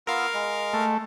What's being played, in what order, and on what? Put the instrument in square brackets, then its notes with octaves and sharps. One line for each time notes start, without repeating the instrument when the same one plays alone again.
[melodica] B3 F4 E6 [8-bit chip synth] A#4 F5
[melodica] G#3
[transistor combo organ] A3